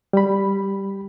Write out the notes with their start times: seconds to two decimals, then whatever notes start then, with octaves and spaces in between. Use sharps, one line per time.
0.13 G3 B5